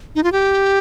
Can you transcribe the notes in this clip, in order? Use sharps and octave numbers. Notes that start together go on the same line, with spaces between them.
D#4
F4
G4